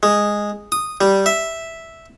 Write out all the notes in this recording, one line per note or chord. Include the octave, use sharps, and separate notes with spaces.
G#3
D#6
G3
E5